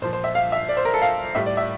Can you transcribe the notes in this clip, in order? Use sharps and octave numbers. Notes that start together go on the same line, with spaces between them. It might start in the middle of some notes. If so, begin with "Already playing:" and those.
A#2 F3 C5
C5
E5
F5
E5
D5
C5
A#4
A4
F5
A2 G3 E5
D5
E5